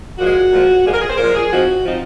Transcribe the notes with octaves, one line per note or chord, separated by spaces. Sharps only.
A#2 F3 G#3 F#4
A#2 F3 G#3
A#2 F3 G#3 G#4
A#4
G#4
C5
A#2 F3 G#3 A#4
G#4
F3 C4 D#4 F#4
F3 C4 D#4 F4